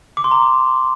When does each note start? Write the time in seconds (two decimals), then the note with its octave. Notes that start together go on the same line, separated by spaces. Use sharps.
0.17 D6
0.24 C6
0.31 A#5